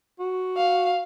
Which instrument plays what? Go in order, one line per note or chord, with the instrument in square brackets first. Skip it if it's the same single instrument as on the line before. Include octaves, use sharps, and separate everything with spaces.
[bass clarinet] F#4
[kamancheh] F5